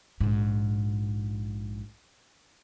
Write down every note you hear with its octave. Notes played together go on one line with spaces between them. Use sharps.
A#1 G#2